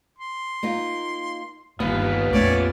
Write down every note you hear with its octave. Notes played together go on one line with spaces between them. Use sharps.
C6
A#3 D#4 F4
G1 D#2 B3 F4 B4
A#1 F2 A3 C#4 C#5 D5 E5